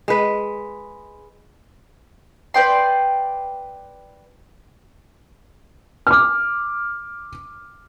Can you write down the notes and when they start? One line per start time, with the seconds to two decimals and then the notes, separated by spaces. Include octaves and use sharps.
0.08 G#3 B4
2.54 B4 D5 G5 C6
6.07 D6 F6